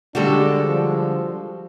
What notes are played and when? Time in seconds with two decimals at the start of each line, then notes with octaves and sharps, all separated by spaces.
0.15 D3 G3 G#3 D4 F#4 G4 A4
0.64 F3